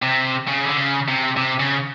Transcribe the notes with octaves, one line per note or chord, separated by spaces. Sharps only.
C3
C#3
D3
C#3
C3
C3
C#3